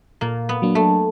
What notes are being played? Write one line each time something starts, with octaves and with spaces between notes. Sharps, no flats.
A#2 A#3
B3
F#3 A#3 D4
A3